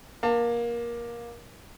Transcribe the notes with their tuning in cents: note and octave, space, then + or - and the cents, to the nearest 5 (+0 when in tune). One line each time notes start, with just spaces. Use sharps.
A#3 +20 A5 +40